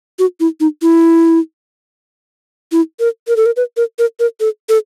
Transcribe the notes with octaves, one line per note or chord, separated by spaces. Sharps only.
F#4
E4
D#4
E4
E4
A#4
A#4
A4
A#4
B4
A#4
A#4
A#4
A4
A4